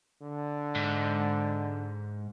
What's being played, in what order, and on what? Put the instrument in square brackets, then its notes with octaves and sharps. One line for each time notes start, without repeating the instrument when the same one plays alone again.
[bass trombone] D3
[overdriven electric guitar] G#2